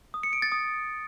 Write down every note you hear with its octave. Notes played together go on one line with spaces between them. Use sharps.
D#6
C#7
D7
A6
D#6